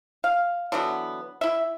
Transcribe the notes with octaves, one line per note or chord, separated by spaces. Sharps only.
F5
D3 E3 F#3 B3
E4 E5